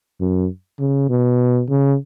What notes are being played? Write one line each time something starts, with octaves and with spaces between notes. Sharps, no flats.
F#2
C#3
B2
C#3